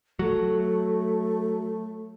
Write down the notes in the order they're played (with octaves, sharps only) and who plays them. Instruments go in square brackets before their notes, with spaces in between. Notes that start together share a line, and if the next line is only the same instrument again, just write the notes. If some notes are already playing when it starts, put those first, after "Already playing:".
[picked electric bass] F#3 [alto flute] A3